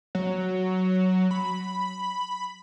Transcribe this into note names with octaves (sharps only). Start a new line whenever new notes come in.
F#3
B5